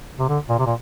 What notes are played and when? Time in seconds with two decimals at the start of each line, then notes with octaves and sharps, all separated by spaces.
0.19 C3
0.29 D3
0.49 A#2
0.59 C3
0.66 A#2